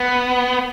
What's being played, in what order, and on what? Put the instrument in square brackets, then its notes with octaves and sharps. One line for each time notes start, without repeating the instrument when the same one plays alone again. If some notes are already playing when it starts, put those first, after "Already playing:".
Already playing: [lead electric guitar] B3